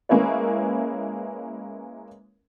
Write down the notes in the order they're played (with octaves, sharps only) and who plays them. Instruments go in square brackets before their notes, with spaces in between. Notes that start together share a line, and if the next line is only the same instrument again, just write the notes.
[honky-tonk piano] G#3 A#3 C#4 E4 B4 C#5